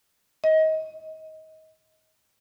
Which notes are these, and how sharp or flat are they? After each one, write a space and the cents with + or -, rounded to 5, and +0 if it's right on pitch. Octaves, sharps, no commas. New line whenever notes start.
D#5 +25